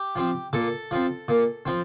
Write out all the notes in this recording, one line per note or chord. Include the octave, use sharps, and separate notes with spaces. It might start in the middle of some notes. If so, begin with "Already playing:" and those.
Already playing: G4
F3 C4
A#2 A4
F3 C4
A#2
F3 C4